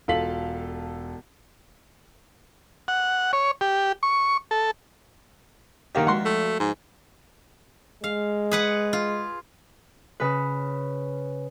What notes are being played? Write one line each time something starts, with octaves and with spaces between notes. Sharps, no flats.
E1 F4 A4 F5 B6 F#7
F#5
C#5
G4
C#6
A4
D#3 A#3 G4 D#5 F5 F#5
F3 G#3 F#4 F#5 C6
A3
G#2
G#3 F5
G#4 B4 F#5
F4
C#3 B4